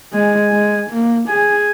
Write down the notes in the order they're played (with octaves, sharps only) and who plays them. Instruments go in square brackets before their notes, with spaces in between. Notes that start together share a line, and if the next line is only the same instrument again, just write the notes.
[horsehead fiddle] G#3 [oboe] G#5
[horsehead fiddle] G#3
A#3
[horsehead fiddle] G#4 [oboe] G#5